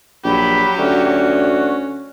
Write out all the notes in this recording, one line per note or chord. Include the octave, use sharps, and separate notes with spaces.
A#1 F#3 G4 B5
D2 C#4 F#4